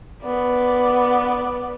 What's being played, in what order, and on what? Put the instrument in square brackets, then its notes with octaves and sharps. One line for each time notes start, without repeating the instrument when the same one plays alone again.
[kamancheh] B3 D5